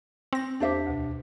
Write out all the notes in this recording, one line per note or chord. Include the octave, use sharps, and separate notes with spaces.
C4 A#6
E2 D4 G4 C5 E5 D6
D2 B2